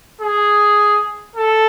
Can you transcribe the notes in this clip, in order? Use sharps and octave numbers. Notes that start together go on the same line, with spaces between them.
G#4
A4